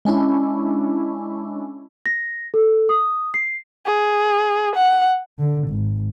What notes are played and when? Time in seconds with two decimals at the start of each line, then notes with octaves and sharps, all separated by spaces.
0.05 G#3 C#4 D4 E4
2.06 A#6
2.54 A4
2.89 D#6
3.34 C7
3.86 G#4
4.76 F#5
5.39 D3
5.68 G#1